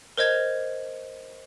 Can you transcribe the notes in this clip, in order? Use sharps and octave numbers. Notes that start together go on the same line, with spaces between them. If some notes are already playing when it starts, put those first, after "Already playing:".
A#4 C5 D#5 G#6